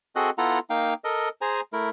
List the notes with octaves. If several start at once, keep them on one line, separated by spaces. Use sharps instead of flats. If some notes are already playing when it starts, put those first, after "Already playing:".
C4 F#4 G#4 A4 D#5 F#6
B3 E4 F4 A4 F#5 A#5
A#3 D#4 F5 G5
A4 A#4 D#5
G#4 C5 G#5 A#5
A3 E4 A#4